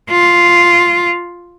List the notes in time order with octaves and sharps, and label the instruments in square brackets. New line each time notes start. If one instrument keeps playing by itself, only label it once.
[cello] F4